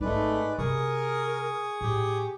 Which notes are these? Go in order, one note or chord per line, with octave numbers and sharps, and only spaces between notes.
G#1 G#3 A3 D#4 B4 D5
C3 G#4 A#4 C#6 D#6
A2 G4